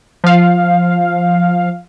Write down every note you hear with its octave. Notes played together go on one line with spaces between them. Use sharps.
F3 F5